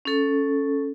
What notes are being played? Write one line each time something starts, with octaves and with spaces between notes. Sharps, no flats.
C#4 A4